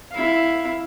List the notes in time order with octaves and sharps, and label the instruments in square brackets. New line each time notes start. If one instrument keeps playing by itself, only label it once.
[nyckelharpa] E4 F5